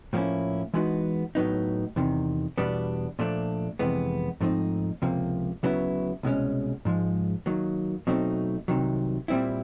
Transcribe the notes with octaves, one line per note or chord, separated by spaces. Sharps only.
A2 F3 A#3 C#4 E4
E3 G#3 B3 D#4 F#4
A2 F#3 B3 D#4
E2 C3 D#3
E2 B2 G3 B3 D4
A#2 F3 A3 D4
F2 C3 E3 G#3 B3
G#2 F3 A3 C4 D#4
C#2 C3 F3 A#3
D2 C#3 F#3 B3 E4
C2 B2 G#3 C#4
G#2 F3 G#3
D#3 F#3 A#3
B2 F#3 A3 C4 D#4
C2 C3 D#3 F#3
A#2 G3 C4 E4